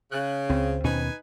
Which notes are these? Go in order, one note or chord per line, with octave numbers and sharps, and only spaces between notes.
C#3 F#6
C#2 C4
D#2 B2 C#4 D#4 B4 G#5